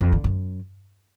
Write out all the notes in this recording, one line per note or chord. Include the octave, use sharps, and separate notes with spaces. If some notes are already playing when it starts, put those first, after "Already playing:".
F2
D3
F#2